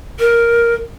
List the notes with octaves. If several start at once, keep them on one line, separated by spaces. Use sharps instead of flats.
A#4